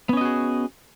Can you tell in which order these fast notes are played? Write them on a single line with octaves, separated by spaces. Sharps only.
B3 C#4 D#5 F#4 G#4